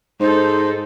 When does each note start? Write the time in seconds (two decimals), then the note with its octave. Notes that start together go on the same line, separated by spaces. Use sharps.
0.20 G#2 D#4 A4 C5